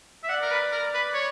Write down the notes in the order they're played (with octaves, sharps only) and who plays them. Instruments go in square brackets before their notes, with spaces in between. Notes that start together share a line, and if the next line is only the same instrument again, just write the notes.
[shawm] E5
[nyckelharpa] D5 [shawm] F#5
[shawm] A#4
B4
A#4
B4
C#5